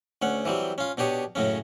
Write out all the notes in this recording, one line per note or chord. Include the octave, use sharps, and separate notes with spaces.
D2 C#4 F#5
E3 F#3 G3 C4
C#4 F4
B2 D4 G4 C#5 D#6
F#2 A2 C#3 C#4